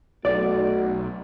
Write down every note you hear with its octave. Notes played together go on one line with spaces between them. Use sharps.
B1 A3 D#4 F#4 D5